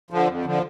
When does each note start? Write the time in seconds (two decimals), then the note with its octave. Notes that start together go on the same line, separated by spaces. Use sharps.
0.11 D3 F3
0.28 F2
0.45 D3 F3